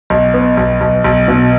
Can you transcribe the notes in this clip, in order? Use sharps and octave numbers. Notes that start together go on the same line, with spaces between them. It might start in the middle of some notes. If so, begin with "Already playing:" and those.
B1
B3
B1
B1
B1
B2